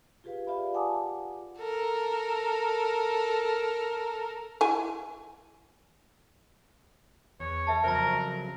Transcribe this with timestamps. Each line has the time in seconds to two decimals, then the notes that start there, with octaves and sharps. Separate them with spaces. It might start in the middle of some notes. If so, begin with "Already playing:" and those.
0.24 F4 G4 G#4 B4 F5
0.47 F4 G4 D5 E5 F5 B5
0.74 F#5 G#5 A5 D6 D#6
1.58 A4 A#4
4.61 E4 G#5
7.40 E2 C#5
7.67 B4 E5 A5
7.84 F2 C#3 F#3 A#4 C5 A#5